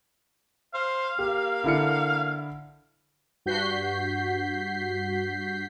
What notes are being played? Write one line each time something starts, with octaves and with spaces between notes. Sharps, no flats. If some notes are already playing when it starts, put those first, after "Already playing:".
C5 F5
A#3 G4
D3 E4 C#7
G2 F#4 G6 B6 C7